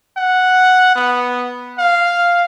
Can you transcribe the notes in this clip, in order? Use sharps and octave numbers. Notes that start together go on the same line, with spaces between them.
F#5
B3
F5